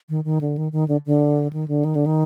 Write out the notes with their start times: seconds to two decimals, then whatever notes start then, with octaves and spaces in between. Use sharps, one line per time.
0.09 D#3
0.24 D#3
0.41 D3
0.58 D#3
0.72 D#3
0.88 D3
1.06 D3
1.53 D#3
1.68 D3
1.85 D#3
1.95 D3
2.06 D#3